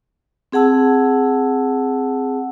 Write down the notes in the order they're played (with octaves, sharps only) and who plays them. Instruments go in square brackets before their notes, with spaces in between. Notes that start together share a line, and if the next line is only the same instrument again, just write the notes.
[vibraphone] C4 G#4 F#5 A5 E6